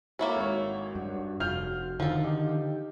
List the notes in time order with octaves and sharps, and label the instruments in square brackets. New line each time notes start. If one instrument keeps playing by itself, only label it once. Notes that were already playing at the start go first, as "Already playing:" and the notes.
[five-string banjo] A#3 E4 A4 [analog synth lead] F#4 [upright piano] C#5
[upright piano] G#1 C#5
[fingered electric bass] G2
[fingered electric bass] F1 [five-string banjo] F4 [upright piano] F6 G6 F7
[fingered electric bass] D3 D#3 [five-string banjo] F3 A4 [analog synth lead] F5
[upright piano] D#4 [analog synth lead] G4